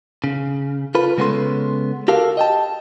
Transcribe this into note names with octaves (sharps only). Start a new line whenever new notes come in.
C#3
F4 A4 B4
C#3 G#3 B3 C#4 A4 C6
F#4 G4 A4 A#4 F5
D#5 G5 A5